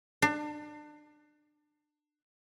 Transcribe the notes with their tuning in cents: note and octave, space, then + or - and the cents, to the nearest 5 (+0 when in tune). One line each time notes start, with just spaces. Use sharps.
D4 +30